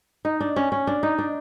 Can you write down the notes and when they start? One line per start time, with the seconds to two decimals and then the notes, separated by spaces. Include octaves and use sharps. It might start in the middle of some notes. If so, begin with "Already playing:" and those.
0.25 D#4
0.40 D4
0.56 C#4
0.72 C#4
0.87 D4
1.03 D#4
1.18 D4